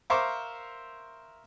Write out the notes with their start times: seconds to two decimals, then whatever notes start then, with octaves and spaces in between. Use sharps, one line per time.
0.10 A#4 C5 E5 F5 C#6 D6